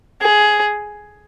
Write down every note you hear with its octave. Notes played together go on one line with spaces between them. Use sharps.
G#4